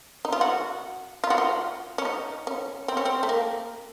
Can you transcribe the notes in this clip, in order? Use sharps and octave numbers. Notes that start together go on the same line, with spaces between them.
D#4
F4
F#4
F4
F#4
F4
C#4
D#4
C#4
C4
C#4
C4
A3
A#3